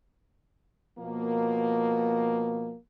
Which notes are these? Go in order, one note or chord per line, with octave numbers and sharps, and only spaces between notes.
B2 F3 A#3